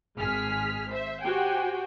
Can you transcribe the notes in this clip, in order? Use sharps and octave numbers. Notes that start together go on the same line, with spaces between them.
G#1 G#3 G#4 F6 B6
C5 E5
F#4 G4 C5 G5 G#5